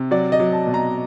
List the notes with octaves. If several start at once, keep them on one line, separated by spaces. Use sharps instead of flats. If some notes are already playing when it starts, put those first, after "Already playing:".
Already playing: C3
F#3 D5
D#5
F#3
A5
B2
A#5